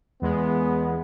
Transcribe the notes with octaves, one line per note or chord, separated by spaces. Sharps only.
E2 G#3 B3